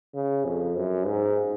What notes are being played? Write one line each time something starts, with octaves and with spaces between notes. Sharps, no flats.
C#3
F2
F#2
G#2